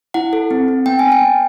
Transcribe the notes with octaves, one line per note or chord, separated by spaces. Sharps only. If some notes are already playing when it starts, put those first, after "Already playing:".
E4 F#5
A4
C4
C4
B3 G5
B3 G#5
G5
B3